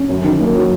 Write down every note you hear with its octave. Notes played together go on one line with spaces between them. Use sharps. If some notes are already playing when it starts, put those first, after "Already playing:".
Already playing: C#4
F#2
D#3
A#3
F#3